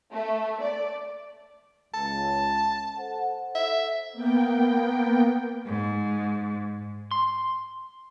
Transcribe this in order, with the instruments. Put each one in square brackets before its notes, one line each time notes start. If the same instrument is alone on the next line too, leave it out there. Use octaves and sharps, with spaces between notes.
[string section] A3
D5
[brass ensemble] C#2 [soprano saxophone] A5
[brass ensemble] A4 C5 F#5
[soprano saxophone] E5
[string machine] A#3 B3 G5
[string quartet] G#2
[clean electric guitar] C6